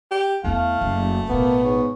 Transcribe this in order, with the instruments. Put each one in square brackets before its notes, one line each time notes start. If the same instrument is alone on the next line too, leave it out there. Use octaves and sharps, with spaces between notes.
[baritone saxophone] G4
[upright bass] E2 E4 [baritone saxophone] A3 [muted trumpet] F5
[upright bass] F#1
[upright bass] A1 B2 [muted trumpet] A#3 [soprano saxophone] B3
[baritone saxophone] G#2 [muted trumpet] C#5